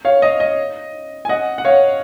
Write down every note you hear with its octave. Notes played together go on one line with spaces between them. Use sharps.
C#5 F5
D#5
D#5
G#5
D#5 F#5
F#5
C#5 F5